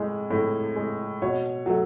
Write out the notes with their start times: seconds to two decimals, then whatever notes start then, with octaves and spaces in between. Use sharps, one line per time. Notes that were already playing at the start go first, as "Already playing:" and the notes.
Already playing: A2 G#3
0.31 A2
0.76 G#3
1.22 B2 C#5
1.66 F#3 A3